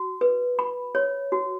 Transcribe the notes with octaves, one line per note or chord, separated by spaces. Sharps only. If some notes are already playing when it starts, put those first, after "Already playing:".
Already playing: F#4
B4
B5
C#5
F#4